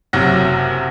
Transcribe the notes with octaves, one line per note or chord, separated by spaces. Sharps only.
F#1 C3 F#3 F#5 A#6